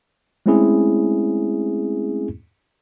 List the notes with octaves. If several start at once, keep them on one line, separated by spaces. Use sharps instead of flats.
G#3 A3 C4 C#4 E4 G#4